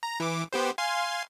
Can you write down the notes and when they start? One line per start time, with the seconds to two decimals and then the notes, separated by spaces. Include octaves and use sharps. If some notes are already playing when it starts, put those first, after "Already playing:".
0.03 A#5
0.20 E3 D6
0.53 B3 G4 C5
0.78 F5 G#5 C6